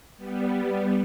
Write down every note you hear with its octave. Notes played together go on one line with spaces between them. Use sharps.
G3 B3